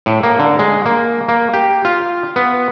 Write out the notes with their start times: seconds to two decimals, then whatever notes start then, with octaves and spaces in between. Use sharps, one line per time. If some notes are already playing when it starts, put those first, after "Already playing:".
0.06 A2
0.23 A#3
0.39 D3
0.59 G#3
0.86 A#3
1.28 A#3
1.53 G4
1.85 F4
2.36 B3